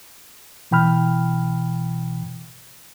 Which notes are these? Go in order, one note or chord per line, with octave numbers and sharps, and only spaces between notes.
B2 E3 G5 B5 F6